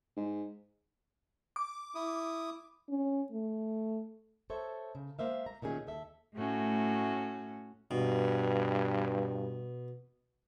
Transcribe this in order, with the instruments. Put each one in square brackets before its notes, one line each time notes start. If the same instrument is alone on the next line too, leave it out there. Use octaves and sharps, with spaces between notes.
[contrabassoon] G#2
[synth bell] D6
[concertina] E4 D#6
[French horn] C#4
A3
[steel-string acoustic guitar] A4 C5 C#5 E5
C#3
G#3 A#3 C5 E5 F5
A#5
D2 A#2 D#3 C#4 G#4 E5
D#2 A4 E5
[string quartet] A2 A3 C#4 F#4
[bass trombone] G2 [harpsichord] B2